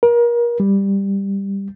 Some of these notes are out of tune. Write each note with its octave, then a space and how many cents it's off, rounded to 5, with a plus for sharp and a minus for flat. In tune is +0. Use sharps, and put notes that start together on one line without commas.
A#4 +30
G3 +10